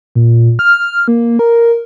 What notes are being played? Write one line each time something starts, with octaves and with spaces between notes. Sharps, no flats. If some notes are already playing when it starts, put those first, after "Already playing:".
A#2
F6
A#3
A#4